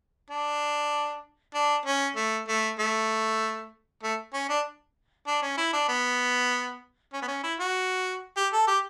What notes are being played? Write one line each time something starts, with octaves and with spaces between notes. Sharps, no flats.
D4
D4
C#4
A3
A3
A3
A3
C#4
D4
D4
C#4
E4
D4
B3
C#4
B3
C#4
E4
F#4
G4
A4
G4